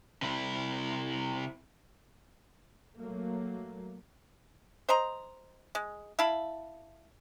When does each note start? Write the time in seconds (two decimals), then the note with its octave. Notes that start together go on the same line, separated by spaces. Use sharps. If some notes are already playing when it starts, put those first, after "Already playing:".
0.22 C3 E4
2.97 F#3 A3 A#3
4.89 C5 D#5 A#5
5.75 G#3
6.19 E4 F5 A5 B5